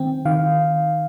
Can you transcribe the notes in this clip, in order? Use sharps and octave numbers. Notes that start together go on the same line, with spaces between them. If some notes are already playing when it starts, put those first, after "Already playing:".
Already playing: D#3 C4 G5
D#3 F5